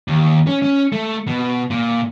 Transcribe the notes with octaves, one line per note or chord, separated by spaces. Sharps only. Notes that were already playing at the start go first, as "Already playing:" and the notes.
D#2
C#4
C#4
A3
B2
A#2